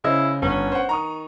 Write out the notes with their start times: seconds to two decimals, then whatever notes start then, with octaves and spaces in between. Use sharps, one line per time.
0.04 C#3 E4 C5 D#5
0.42 G1 C#4
0.72 C5 F#5
0.89 D#3 A#5 C#6 D#6